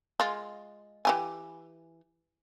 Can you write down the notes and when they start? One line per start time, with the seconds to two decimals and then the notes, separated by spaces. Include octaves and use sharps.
0.20 G#3 F4
1.05 E3 G4 G#5